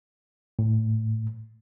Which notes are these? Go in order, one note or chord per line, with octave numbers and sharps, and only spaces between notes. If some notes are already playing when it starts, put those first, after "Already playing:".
A2